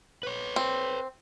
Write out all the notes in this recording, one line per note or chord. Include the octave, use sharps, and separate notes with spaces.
B4 C#5
C4